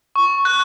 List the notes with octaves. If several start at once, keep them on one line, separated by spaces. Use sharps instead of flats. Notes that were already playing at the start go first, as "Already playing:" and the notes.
C#6
F#6